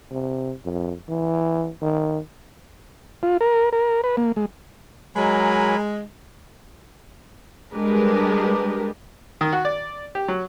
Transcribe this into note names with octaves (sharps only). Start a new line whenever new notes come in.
C3
F2
E3
D#3
F4
A#4
A#4
B4
A#3
G#3
F#3 G#3 A#4 G#5 B5
G3 G#3 D4 G4 A#4 B4
D#3
F#4
D5
G4
F#3